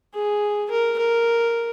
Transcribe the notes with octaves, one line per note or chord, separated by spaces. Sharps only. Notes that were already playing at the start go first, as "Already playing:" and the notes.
G#4
A#4
A#4